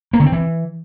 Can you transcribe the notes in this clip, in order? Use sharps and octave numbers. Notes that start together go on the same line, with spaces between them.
A#3
D3
C4
E3